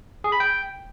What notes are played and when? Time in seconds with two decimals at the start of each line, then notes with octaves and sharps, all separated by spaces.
0.24 G#4
0.32 B5
0.40 G5